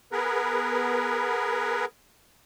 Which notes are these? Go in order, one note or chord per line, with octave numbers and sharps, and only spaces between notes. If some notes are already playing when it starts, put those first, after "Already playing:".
B3 G#4 A#4 B4